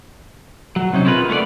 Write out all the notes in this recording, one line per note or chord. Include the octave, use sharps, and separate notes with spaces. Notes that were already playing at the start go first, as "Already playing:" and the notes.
F#3
C3 C#4 D#4
E4 F4 G#4 A#4 B4
A3 B3 C#5 D5